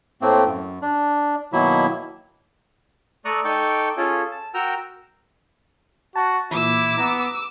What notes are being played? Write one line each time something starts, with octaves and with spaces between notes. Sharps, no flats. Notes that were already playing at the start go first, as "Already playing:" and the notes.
A2 A3 A#3 C4
F#2
D4
B2 D#3 F#3 A#3 E4
A3 D5 A#5 C#6 D#6 F#6
D#4 A4 G5 C#6 D6
C#4 F4 G#4 A4
A5
F#4 A#4 G5 A#5 E6 F6
F#4 A5
A#2 E3 E4 D6 E6
B3 A#5